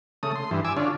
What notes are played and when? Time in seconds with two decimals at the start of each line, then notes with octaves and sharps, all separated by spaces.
0.23 C#3 A3 D#6
0.35 C6
0.51 G2 E3
0.65 G#5 D6 E6
0.77 D3 C#4 D4 F4